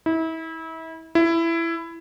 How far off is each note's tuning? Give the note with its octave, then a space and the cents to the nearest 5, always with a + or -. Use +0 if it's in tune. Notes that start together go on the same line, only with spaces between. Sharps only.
E4 -30
E4 +15